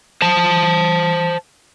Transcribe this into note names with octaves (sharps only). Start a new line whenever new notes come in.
C5 A5